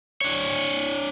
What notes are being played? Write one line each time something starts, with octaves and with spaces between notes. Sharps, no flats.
D4 C#5